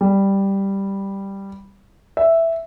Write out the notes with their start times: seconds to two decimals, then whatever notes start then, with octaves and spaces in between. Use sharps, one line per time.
0.01 G3
2.17 E5